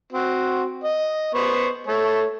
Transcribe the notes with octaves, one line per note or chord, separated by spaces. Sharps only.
C4 F#4
D#5
B3 C5 C#6
A3 A4 C#5